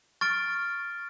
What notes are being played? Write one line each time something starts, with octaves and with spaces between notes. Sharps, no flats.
C#6 F6 A6 D7